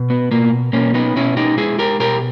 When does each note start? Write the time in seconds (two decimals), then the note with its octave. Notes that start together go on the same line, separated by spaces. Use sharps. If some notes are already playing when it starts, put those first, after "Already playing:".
Already playing: B2
0.10 B3
0.31 B2 A#3
0.73 B2 A#3 C#4
0.94 B3 D#4
1.16 B2 C#4 E4
1.37 D#4 G4
1.57 G#3 E4 G#4
1.79 G4 A#4
2.00 B2 G4 A#4